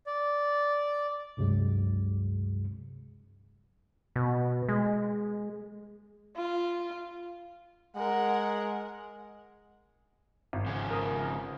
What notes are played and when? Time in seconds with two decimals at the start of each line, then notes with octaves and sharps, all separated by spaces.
0.07 D5
1.37 C#2 G2 C3 F#3 G#3
4.16 B2
4.69 G#3
6.37 F4
7.96 G#3 A#4 F#5
10.53 G#1
10.66 C#3 F3
10.91 A#4 D#6